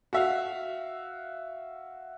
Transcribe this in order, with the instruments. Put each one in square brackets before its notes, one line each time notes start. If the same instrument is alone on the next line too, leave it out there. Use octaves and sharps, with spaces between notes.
[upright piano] F#4 E5 F5